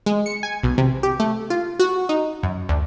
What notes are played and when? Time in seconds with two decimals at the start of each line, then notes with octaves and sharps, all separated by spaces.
0.06 G#3
0.26 C#7
0.43 G#5
0.63 B1
0.78 C3
1.03 G4
1.20 A3
1.50 F4
1.79 F#4
2.09 D#4
2.43 F#2
2.69 D2